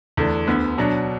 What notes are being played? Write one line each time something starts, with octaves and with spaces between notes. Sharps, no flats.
E2 D3 A3 D4
D2 D3 B3
B2 F#3 D4